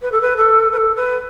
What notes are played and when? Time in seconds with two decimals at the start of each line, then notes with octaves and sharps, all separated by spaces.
0.02 B4
0.12 A4
0.21 B4
0.37 A4
0.72 B4
0.77 A4
0.96 B4